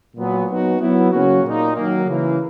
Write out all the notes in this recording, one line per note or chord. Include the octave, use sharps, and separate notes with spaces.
A#2 F#3 B3
F#3 B3 D#4 F#4
F#3 B3 E4
C#3 F#3 A#3 C#4 F#4
A#2 A#3 D#4
D#3 F#3 A#3
C#3 E3 A#3